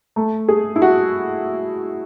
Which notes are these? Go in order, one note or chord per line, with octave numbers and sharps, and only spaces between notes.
A3
G#4
E4
F#4